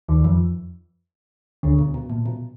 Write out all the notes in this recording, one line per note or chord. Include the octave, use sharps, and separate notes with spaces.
D#2 D#3
F2 F3
D2 D3
B2
B2
A#2
B2